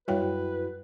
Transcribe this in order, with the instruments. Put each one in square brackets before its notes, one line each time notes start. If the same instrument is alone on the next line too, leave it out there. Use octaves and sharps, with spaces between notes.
[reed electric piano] F#2 E4 F#4 [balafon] G3 C#5 G5 [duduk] B4